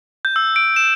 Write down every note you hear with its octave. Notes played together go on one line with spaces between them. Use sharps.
G6
E6
D7
E7